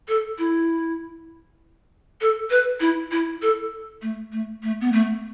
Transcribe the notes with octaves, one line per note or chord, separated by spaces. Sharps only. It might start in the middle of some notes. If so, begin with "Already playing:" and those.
A4
E4
A4
B4
E4
E4
A4
A3
A3
A3
B3
A3